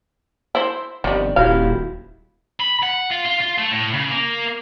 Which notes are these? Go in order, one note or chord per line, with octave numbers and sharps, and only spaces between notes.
E4 C5
G1 F2 D#3 G3
D#1 E4 F#4 G4 F5
B5
F#5
F4
F4
F4
A3
A2
C#3
A#3